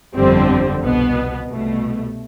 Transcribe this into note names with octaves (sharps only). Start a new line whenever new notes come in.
G1 F2 D3 G3 C4
C2 B2 B3
C2 B2 A3